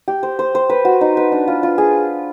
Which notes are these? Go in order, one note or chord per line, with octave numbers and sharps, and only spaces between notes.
G4
C5
C5
C5
B4
F#4
D#4
B4
D4
F4
F4
G#4